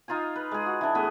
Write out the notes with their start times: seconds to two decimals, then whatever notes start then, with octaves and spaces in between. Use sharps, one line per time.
0.08 D#4 F4 F5 G#5
0.36 B4
0.51 G#3 G#4
0.66 F#4
0.81 E3 D4
0.95 A2 B3 G#4